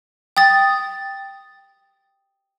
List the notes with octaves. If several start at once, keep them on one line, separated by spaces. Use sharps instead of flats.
G5 D#6 A6